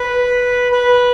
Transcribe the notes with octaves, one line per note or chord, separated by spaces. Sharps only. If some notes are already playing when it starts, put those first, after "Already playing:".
Already playing: B4
B4